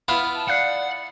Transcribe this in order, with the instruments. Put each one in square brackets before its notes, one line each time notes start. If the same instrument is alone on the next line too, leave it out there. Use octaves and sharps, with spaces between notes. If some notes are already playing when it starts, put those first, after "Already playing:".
[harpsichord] B3 E4 F4 [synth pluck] F5 F6
[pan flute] A5
[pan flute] D5 [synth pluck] F5 F#6 C7 [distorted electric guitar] F#5